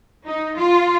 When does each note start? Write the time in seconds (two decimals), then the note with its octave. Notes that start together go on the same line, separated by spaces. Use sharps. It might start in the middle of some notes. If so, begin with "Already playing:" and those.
0.25 D#4
0.57 F4